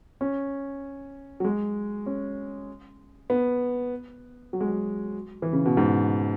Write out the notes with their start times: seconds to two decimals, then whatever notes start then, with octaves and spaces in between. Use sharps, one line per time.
0.21 C#4
1.40 F#3
1.44 G#3
2.06 C#4
3.30 B3
4.53 F#3
4.61 G#3
4.68 F#3
5.42 E3
5.53 C#3
5.65 B2
5.77 G#2